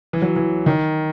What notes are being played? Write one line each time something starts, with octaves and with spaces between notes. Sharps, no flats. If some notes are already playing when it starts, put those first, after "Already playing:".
E3
F#3
E3
D#3